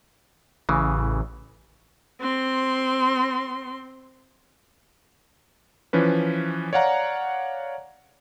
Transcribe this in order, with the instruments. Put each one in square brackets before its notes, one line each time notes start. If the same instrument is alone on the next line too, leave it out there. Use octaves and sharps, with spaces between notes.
[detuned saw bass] A1 [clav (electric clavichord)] C#3 E3
[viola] C4 C6
[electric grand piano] E3 F3 C#4 B4
C#5 D5 F5 F#5 A#5